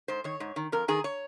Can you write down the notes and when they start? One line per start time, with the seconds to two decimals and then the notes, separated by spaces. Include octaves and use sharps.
0.08 G#2 C5
0.24 D#3 C#5
0.40 G#2
0.56 D#3
0.72 F2 A#4
0.88 D#3 G#4
1.04 C#5